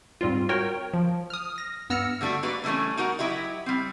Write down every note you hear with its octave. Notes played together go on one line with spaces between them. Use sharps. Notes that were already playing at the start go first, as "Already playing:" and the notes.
G#2 G3 C4 F4
F#4 A#4 C#5 G5
F3
D#6 F6
A#6
G2 B3 E6 F6 A#6 C#7
D3 G3 A3 D4 F#4
A#3 F#4 B4 D5
D3 E3 G3 A3 C#4
D#4 F#4 A#4 F#5
F#3 E4 G4 D#5
G3 C4